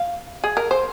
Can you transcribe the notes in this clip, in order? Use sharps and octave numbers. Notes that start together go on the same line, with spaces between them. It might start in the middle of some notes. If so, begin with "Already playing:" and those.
Already playing: F5
G#4
A#4
C5